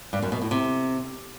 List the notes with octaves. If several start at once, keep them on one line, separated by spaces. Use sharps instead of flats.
G2
F#2
B2
A2
C3